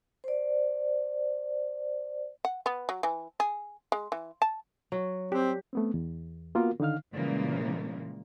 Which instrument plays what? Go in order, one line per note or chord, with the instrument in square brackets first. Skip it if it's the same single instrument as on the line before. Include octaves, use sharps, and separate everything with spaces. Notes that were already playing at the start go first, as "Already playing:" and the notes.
[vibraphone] C5 D5
[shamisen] F#5
B3
F#3
E3
G#4
G#3
E3
A5
[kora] F#3
[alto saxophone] C4 [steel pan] G4
[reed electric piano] A3 B3 C4
E2
A#3 B3 F4 F#4 A#4 F5
D3 D#3 D#4 F5 F6
[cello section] A#2 C#3 E3 G3 G#3 A#3